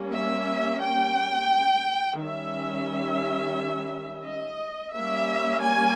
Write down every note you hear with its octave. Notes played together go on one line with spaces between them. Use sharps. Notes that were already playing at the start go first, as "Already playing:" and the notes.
Already playing: G3 A#3 C#4
E5
G5
D#3 G3 C#4 E5
D#5
G3 A#3 C#4 E5
G#5